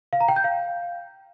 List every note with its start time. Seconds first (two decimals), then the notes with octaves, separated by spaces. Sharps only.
0.13 F5
0.20 A#5
0.28 G5
0.36 G6
0.44 F5